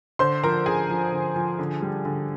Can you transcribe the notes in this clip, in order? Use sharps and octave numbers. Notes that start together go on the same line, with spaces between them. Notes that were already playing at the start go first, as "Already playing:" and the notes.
D3 C5 C6
F3 A#4 A#5
D3 G#4 G#5
F3
D3
F3
D3
G3
D3